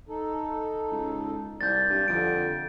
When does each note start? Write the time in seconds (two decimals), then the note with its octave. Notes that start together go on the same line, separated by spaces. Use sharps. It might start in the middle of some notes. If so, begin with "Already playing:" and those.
0.09 D#4 A4
0.91 C#2
1.61 C2 D5 G6 A6
1.89 G2
2.08 F2 D3 D7